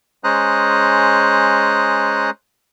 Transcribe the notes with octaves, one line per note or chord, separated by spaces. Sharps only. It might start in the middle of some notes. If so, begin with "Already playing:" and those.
G#3 C#4 C5 A#5 D#6 F#6